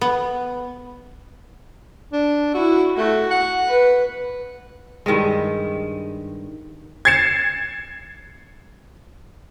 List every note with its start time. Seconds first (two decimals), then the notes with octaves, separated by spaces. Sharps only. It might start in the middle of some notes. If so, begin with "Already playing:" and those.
0.01 B3
2.13 D4
2.54 E4 F#4
2.98 A3 F#4
3.31 F#5
3.68 B4
5.06 G2 D#3 G3 G#3
7.05 G#6 A6 C7 C#7 E7